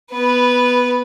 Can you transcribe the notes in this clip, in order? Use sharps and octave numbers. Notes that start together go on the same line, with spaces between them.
B3 B4